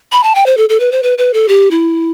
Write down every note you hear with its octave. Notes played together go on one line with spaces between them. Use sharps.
B5
A5
G5
C5
A4
A4
B4
C5
B4
B4
A4
G4
E4